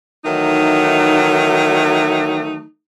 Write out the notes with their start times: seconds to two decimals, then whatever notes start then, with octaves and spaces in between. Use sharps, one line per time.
0.25 D#3 E3 F#3 A3 D#4